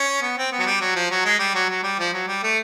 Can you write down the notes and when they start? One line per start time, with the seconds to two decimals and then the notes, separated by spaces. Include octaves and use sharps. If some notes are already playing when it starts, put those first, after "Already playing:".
Already playing: C#4
0.22 B3
0.38 C4
0.52 B3
0.59 F#3
0.66 G3
0.81 F#3
0.95 F3
1.10 F#3
1.25 G#3
1.39 G3
1.54 F#3
1.69 F#3
1.83 G3
1.99 F3
2.13 F#3
2.27 G3
2.43 A3